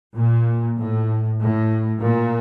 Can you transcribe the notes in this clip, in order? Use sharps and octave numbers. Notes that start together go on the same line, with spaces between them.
A#2
A2
A2
A#2